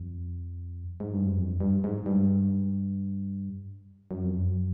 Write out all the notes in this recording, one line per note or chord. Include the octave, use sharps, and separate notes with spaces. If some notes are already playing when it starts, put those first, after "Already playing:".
Already playing: F2
G#2
G2
F#2
F2
G2
G#2
G2
F#2
F2
F#2